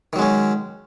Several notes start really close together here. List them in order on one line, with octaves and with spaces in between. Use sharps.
D#3 F#3 G#3 C#4